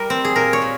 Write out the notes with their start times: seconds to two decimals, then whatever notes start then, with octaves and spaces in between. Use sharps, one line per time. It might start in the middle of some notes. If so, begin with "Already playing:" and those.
Already playing: G3 A#4
0.10 C4
0.25 G#4
0.36 A#2 A#4
0.53 C#5
0.62 A#2